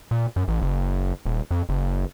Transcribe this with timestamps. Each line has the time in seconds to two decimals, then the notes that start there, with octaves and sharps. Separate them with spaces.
0.11 A#2
0.36 F#2
0.48 A1
0.62 F#1
1.26 D#1
1.51 F2
1.69 F#1